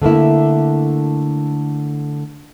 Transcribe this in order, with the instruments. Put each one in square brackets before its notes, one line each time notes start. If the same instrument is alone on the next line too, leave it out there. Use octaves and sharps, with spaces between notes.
[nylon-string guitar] D3 A3 A#3 E4